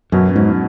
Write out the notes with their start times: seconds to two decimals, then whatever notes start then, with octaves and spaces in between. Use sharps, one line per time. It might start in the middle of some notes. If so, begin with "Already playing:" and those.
0.12 F#2 B2 F#3 C#4
0.36 G#2